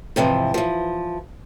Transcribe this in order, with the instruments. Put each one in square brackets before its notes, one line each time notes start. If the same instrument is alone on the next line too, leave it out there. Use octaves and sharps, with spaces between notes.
[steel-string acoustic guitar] G#2 C3 E3 F3
E3 F3